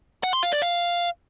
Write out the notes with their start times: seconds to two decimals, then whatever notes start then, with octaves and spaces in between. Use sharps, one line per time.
0.24 F#5
0.33 C6
0.43 F5
0.52 D5
0.62 F5